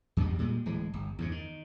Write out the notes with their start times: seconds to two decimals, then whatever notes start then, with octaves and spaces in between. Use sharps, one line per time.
0.17 E2 G2 B2 G3
0.39 A#2 G3 G#3
0.66 D1 E3 G#3
0.94 G1
1.19 E2 G2 C3
1.32 D#3